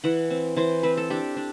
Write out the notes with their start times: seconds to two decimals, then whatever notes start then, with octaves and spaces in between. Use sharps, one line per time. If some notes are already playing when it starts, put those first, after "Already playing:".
0.04 E3 F#5
0.30 C4
0.56 E3 C5
0.83 C4 B4
0.97 A4
1.10 D4 G4
1.37 D4